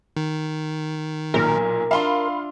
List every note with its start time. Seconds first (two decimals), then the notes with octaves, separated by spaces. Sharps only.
0.17 D#3
1.34 B1 A#2 A#4
1.91 D4 F4 E5 F5 B5 C6